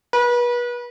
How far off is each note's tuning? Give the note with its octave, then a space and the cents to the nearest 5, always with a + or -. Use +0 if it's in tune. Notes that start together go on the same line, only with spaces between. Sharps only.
B4 -35